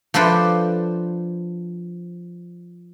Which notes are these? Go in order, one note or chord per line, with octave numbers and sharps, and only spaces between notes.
F3 D4 A4 B4 C5 G5